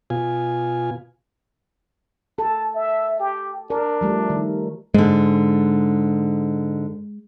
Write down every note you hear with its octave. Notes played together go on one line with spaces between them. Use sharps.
B2 F4 G#5
A4 A5
E5
G4
D4 A#4
F3 G3 A3
D#3
G#2 D3 G#3